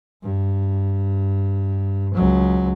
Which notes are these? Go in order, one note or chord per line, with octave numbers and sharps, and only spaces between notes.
G2
C#2 F#3